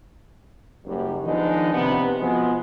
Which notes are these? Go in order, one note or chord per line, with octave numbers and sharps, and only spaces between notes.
F#1 F#2 G3
D#3 F3 G#3 B3 D4 D#4
C3 B3
B2 F3 G#3 B3